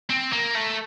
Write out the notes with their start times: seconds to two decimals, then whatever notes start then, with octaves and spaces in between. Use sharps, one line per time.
0.10 C4
0.32 A#3
0.55 A3